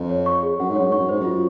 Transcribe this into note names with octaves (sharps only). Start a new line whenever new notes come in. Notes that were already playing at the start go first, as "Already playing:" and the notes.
Already playing: F2
C#5
C#6
G#4
F#2 F#5
G#2
F#2 C#5
G#2 C#6
F#2
G#2 C5
F#2 F4